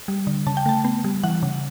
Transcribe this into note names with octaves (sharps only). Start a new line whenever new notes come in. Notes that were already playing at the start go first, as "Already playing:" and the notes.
G3
D3
C#3 A5
G5
A3 A5
B3
G3
E3 F#5
C#3